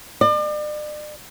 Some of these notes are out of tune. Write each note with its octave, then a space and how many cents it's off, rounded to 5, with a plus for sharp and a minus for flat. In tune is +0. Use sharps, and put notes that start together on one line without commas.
D5 +40